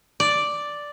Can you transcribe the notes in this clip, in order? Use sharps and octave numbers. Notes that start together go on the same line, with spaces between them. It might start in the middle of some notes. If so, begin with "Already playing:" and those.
D5